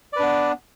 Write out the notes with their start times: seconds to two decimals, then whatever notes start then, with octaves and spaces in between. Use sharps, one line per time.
0.13 D5
0.16 B4
0.19 D4
0.23 B3